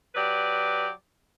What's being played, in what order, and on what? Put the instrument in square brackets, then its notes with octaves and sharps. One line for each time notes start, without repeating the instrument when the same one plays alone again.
[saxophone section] F#3 G4 B4 D5